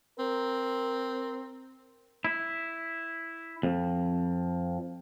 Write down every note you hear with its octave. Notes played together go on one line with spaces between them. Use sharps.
C4 A#4
E4
F2